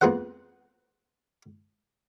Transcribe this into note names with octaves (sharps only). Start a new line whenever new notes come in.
F2 A#3 B3 G#4 C5 F#5